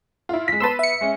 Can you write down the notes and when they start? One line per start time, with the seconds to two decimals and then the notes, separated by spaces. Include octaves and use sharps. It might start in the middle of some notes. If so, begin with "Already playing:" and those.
0.29 E4 F4
0.48 G#3 B6
0.60 B3 B4 A5 C6 E6
0.79 E5 C#7
1.01 G#3 C#4